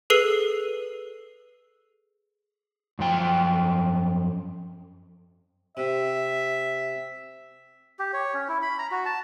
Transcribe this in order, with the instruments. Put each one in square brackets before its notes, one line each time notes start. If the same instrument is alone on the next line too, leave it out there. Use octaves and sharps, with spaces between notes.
[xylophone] G#4 A4 B4 E6 C7 D#7
[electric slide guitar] F#2 F3 G5
[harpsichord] C3 [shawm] E5
[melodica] G4
C#5
C#4
E4
B5
A#5
F#4
A5